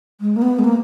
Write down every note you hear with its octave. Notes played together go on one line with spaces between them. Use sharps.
G#3
A#3
B3
G#3
A#3